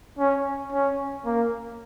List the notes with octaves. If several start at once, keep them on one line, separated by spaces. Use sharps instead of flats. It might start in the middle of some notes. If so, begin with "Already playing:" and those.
C#4
C#4
A#3